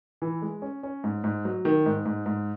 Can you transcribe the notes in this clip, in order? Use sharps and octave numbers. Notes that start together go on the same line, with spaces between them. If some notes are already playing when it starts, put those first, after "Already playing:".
E3
G#3
C#4
C#4
G#2
G#2
F#3
D#3
G#2
G#2
G#2